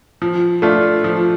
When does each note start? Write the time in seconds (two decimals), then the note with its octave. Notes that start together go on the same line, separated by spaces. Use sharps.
0.22 F3
0.62 A3 D4 F4
1.04 F3